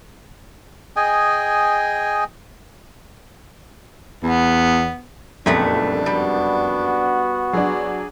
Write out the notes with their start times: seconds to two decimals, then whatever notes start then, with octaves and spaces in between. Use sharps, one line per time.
0.96 G#4 D#5 G5 G#5
4.23 E2 B3
5.46 F#1 C2 F2 A#2 A3 B3 D4
6.06 G3 B3 F#4
7.53 F#3 D4 G#4